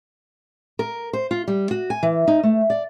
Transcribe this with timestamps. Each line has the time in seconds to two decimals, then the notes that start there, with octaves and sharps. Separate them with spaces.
0.79 A#4
1.13 C5
1.31 F4
1.48 G3
1.71 F#4
1.90 G#5
2.03 E3
2.28 D#4
2.43 A3
2.70 D5